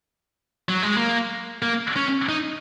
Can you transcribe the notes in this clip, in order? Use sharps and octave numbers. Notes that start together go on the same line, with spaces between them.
F#3
G#3
A#3
A#3
C#4
D#4